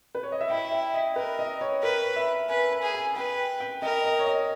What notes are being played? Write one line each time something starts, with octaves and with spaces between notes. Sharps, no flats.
B4
C#5
D#5
E5
E4 G5
E5
D#5
A#4 B4
D#5
C#5
A#4 B4
E5
B4 G#5
G#5
G#4
G#5
B4 G5
G5
A#4 D#5
D#5
C#5
D#5